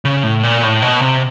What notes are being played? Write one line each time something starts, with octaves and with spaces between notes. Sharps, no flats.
C#3
A2
A#2
A2
B2
C3